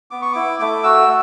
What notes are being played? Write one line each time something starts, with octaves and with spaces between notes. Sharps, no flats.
B3 D6
C#6
E4 D6
A3 D6
F#4 E6